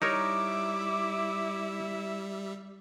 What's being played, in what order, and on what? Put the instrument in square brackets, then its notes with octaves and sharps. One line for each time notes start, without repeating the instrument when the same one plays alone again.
[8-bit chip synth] G3 E5 [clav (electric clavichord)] D#4 A#4 C#5 [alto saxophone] E4 [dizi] D6